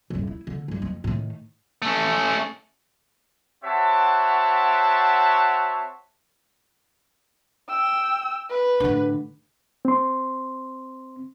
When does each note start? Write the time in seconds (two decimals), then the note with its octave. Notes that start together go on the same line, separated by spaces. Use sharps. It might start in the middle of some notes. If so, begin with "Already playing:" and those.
0.10 D#1 G2
0.27 E4
0.47 D3
0.68 G1 G3
0.82 F2
1.04 A2 D#3
1.82 A3 C#4
3.64 C4 F#4 C#5 E5 F#5 A5
7.69 G5 E6
8.50 B4
8.80 A1 D3
9.85 C4 C6